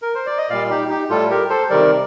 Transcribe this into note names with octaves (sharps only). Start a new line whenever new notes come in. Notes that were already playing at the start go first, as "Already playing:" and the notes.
A#4
C5
D5
D#5
A#2 G3 D5 F5
D#4 G4
D#4 G4
A2 G3 F4 A4
G4 A#4
A4 C5
C3 D#3 G3 A#4 D5